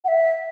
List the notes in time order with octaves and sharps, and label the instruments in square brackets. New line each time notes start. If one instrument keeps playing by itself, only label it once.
[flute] F#5
E5